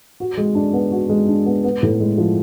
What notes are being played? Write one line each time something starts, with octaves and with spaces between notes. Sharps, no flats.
F#4
G#3
D4
B3
F#4
G#3
D4
B3
B3
A2
G#3
F3